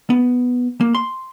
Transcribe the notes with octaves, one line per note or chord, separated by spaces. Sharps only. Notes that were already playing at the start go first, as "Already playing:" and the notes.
B3
A#3
C6